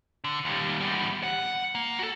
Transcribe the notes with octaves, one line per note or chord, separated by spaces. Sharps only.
D3
D#2 G3
E2 G3
F#5
A#3
F#4 A4